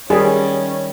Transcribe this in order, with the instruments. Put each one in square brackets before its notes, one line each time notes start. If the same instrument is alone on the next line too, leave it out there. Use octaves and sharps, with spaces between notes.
[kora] D#3 G3 [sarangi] C#4 [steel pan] G#4